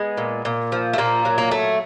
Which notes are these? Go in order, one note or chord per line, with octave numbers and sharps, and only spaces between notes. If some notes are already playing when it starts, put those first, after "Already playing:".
Already playing: G#3 B3
A#2
A#2
F3
A3
A#2 A#3
F#3
A#3
A3